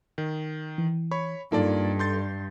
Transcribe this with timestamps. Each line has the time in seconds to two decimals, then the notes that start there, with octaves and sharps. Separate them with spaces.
0.18 D#3
0.78 E3
1.11 C#5 B5 C#6
1.52 G2 A#3 D#4 F4 A4 D5
1.99 C6 G6 A6